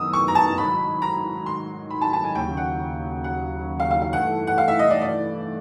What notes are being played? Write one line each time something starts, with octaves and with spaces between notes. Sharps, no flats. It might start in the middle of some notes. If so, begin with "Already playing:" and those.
Already playing: F#2 D#3 F#3 B3 D#6 E6
C#6
A#5
A5
G#2 D#3 F#3 B5
A#5
C6
B5
A5
A5
G#5
D#2 C#3 F#3 G5
F#5
F#5
F5
F5
F5
G2 E3 A3 F#5
F#5
F5
E5
D#5
D5
D5